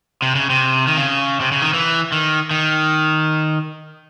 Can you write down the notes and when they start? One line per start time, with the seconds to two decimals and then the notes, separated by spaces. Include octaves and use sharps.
0.22 C3
0.35 C#3
0.50 C3
0.87 D#3
0.97 C#3
1.40 C3
1.52 C#3
1.62 D#3
1.73 E3
2.12 D#3
2.51 D#3